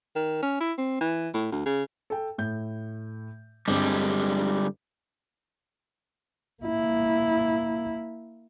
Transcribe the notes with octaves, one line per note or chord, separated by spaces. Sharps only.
D#3
C#4
E4
C4
E3
A2
D2
C#3
A4 G5
A2 G6
G1 D3 G3 G#3 C4 C5
A#3 E4